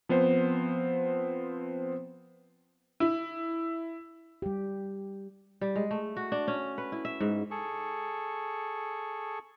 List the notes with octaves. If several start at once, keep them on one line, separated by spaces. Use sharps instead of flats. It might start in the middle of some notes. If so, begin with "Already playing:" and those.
F3 B3 C4 C5
E4
G3 G4
G3
G#3
A3
F#4
D4
C#4
B4
E4
E5
G#2
G#4 A4 C#6